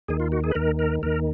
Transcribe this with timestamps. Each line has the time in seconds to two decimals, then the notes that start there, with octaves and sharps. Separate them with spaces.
0.08 D#2 D#3 G#4
0.20 F4
0.32 F#4
0.44 G#4
0.51 B4
0.55 D#2 D#3 A#4
0.79 A#4
1.03 D#2 D#3 A#4